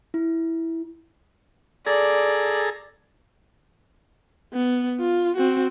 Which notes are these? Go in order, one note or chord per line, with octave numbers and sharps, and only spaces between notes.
E4
G#4 A4 D5 A#5
B3
F4
C4 F#4